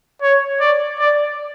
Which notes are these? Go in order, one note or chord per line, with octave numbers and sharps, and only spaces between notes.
C#5
D5
D5